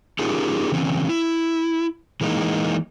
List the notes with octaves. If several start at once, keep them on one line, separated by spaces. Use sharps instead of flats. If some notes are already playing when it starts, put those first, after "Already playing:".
C#4 D#4 F4 G4 G#4 A#4
C#3 E3 C4 C#4
E4
E3 G#3 A#3 D4 D#4